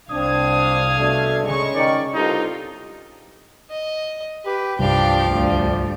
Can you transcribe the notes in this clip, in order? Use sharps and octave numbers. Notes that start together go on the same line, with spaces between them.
C2 C4 D4 F5 D#6 G#6
B2 A3 D4
C#3 G#3 C#6
D#3 D5
C2 G2 D#4 F4 A4
D#5
G4 B4
C2 G2 F3 D4 G4 F5 G5
D2 G3